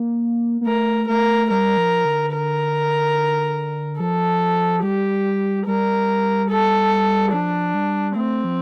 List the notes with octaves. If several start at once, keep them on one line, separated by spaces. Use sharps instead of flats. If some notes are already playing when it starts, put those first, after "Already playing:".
Already playing: A#3
A#3
A3 A#4
A3 A#4
G3 A#4
F3
D3
A#4
F3 A4
G3 G4
G3 A#4
A4
F3 D4
G3
A3 C4
F3